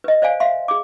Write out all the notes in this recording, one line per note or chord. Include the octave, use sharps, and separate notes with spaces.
B4 D#5
C5 D5 F5 G#5
E5 F5 C6
G#4 D6